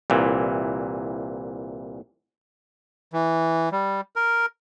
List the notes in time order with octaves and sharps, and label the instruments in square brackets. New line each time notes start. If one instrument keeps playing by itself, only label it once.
[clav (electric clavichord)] C2 A#2 E3
[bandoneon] E3
G3
A#4